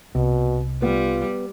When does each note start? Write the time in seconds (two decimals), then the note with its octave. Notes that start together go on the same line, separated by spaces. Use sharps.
0.15 C2 B2
0.82 G3 B3 F4